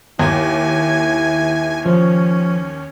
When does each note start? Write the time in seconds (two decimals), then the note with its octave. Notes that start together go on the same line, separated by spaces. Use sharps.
0.19 D#2 E4 G#5
1.86 F3 C#4